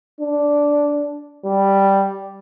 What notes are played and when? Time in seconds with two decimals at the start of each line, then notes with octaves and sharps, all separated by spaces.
0.20 D4
1.45 G3